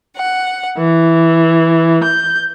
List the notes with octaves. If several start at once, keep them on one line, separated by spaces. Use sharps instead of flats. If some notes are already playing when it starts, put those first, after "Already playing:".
F#5
E3
G6